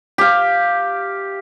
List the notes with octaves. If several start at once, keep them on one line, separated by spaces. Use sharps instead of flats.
G4 F5